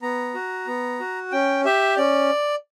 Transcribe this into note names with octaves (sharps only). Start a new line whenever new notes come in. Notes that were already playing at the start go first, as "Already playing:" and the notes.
B3 A#5
F#4
B3
F#4
C#4 G5
G4 E5
C#4 D5